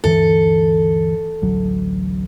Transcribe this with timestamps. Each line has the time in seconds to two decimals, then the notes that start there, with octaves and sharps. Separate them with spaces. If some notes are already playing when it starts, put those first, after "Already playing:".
0.04 D2 G2 E3 A4
1.42 A1 D2 F#3